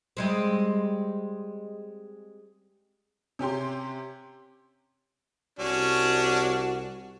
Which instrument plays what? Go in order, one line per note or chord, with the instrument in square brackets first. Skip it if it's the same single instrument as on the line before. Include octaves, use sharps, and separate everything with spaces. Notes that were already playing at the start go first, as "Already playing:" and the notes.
[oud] G3 G#3 C4
[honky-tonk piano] C3 C#4 G4 C6
[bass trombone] C2 [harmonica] C#4 D4 [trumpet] F#4